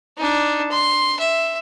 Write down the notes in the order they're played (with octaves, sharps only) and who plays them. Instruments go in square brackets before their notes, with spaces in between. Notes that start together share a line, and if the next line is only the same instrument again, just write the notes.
[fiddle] D4 D#4
C6
E5